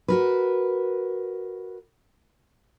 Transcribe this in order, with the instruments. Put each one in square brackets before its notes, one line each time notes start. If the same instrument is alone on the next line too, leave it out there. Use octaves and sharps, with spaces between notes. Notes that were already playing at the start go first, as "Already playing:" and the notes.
[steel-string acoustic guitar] F#4 A#4 B4